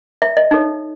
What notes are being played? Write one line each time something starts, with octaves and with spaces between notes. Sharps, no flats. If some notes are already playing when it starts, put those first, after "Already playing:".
E5
D#5
D#4 A4 C#5